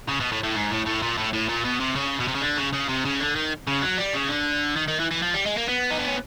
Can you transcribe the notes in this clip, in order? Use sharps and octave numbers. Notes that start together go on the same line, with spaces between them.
C#3
B2
A2
A2
G#2
A2
A2
A#2
A2
A2
A#2
B2
C3
C#3
B2
C3
C#3
D3
C#3
C#3
C3
C#3
D3
D#3
C#3
F#3
G3
C#3
D3
D#3
D#3
E3
E3
F3
G3
G#3
A#3
B3
D#4
D4
C#4